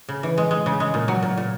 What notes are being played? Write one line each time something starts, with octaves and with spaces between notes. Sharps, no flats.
C#3
E3
G#3
G#3
C#3
G#3
A#2
F#3
A#2
A#2